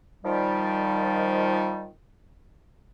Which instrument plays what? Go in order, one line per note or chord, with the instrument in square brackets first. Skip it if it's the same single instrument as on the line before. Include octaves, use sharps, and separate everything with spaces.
[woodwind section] D#3 F3 G3